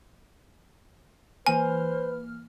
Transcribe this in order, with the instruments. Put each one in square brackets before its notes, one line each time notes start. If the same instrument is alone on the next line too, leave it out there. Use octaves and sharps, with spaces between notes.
[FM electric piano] E3 A#3 F6 [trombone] B4 [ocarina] C5 [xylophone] G#5